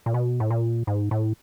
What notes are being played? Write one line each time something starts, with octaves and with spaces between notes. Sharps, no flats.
A#2
B2
A2
A#2
G#2
A2